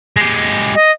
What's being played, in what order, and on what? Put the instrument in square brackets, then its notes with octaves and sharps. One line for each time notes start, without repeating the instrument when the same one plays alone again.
[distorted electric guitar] G#3 G4
[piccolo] D#5